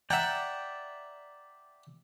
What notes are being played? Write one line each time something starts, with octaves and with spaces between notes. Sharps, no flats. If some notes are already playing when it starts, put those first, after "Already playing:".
D5 E5 F#5 G5 A#5